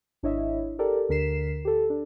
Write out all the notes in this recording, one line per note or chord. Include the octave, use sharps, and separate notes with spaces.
G#1 D4 E4 C#5 D#5 E5
G4 A4 A#4 D5
D2 D3 A#4 B6 C7 E7
G4 A4
D4